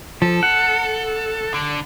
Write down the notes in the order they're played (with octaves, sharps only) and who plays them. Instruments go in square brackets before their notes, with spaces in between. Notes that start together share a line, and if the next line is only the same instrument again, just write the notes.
[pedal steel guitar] F3 [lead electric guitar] A4
[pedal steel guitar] F#5
[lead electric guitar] D3